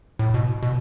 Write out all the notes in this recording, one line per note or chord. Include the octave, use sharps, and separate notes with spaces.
A2
B2
B2